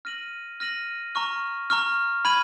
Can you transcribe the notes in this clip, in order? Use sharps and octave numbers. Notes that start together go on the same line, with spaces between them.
F6 A#6 D#7 F#7
F6 A#6 D#7 F#7
A#5 C#6 F6
A#5 C#6 F6
B5 F6 G#6 D#7 F#7